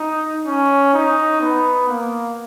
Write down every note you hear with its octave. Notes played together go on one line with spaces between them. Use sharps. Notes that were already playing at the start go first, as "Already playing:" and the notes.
Already playing: D#4
C#4
D#4
B3
A#3